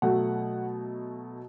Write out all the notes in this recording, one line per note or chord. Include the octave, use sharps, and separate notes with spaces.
B2 F#3 A3 F#5